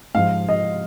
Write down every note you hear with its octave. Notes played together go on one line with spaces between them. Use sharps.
G#2 F3 F5
D#5